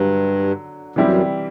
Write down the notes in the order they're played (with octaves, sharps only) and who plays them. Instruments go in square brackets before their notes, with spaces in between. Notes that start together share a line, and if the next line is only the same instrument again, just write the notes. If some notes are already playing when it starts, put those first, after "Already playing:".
Already playing: [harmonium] G2 [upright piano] D3 F#3
[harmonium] F#2 [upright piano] E3 G3 C4 E4 G4